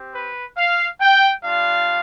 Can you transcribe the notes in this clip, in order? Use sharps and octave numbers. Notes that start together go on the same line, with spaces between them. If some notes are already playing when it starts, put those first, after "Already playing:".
Already playing: C4 G4
B4
F5
G5
G3 D4 F4 F5